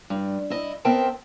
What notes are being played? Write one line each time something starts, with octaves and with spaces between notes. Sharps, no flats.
G2
E4 D#5
B3 C4 A#4 E5 G5 A5